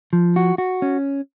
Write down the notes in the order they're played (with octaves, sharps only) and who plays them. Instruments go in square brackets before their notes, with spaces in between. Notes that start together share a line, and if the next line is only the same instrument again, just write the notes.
[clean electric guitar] F3
F#4
F#4
C#4